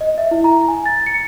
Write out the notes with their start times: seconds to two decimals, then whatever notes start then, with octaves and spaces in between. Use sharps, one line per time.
0.01 D#5
0.18 E5
0.31 E4
0.44 A#5
0.68 G#5
0.86 A6
1.06 C#7